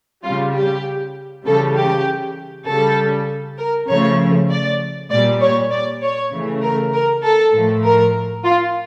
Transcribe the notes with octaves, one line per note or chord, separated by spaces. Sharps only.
C#3 G3 F4
G4
C#3 E3 G3 A4
G4
C#3 G3 A4
A#4
C#3 F3 A3 C#5
D5
A#2 G3 D5
C#5
D5
C#5
C#3 E3 A3
A#4
A#4
A4
A2 F3 A3
A#4
F4